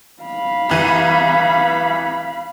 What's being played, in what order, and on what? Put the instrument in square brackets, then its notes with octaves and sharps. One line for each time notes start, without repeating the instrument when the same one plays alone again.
[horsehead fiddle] F5 B5
[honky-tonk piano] C2 E3 D#7